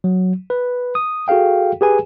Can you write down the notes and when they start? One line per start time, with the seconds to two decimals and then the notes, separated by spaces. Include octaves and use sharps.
0.04 F#3
0.50 B4
0.95 D#6
1.28 F#4 G#4 A4 F5 G5
1.81 G4 G#4 B4 G#5